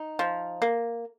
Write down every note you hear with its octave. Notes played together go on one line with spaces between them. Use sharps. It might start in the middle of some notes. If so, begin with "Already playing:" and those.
Already playing: D#4
F3
A#3